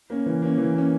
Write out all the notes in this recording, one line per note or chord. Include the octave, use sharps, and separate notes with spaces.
A#3 C#4
E3
A#3 C#4
E3
A#3 C#4